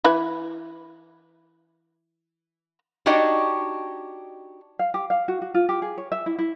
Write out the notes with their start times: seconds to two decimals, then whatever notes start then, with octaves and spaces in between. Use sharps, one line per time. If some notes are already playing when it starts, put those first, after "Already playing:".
0.04 E3 E4 B4
3.06 D4 D#4 F#4 G4 C#5 D#5
4.79 F5
4.94 G4
5.10 F5
5.28 F#4
5.42 F#4
5.54 F4
5.69 G4
5.82 G#4
5.98 C#5
6.12 E5
6.26 E4
6.39 E4